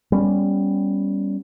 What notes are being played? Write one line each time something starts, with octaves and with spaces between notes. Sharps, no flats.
G3 B3 C#4